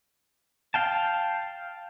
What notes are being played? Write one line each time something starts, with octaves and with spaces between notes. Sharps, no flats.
F5 G5 A5